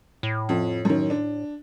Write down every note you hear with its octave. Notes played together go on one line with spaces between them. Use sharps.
A2
F2
F#2 D#3
D4